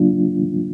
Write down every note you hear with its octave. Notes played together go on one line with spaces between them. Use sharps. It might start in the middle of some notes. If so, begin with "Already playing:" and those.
Already playing: C#3 F#3 A#3 D4 F4